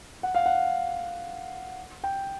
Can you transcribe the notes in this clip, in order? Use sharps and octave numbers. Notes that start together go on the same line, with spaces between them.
F#5
F5
F#5
G5